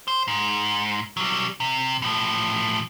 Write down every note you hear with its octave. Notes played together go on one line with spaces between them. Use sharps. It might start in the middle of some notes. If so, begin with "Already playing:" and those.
C5
G#2
F#3 G3
C3
A2 F3